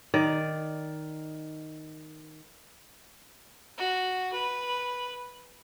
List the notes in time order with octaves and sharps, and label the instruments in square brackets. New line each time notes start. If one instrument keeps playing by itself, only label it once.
[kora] D#3 D5
[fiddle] F#4
B4